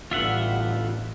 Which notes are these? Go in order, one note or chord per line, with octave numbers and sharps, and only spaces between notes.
A1 D3 G3 B3 F4 E5 F#5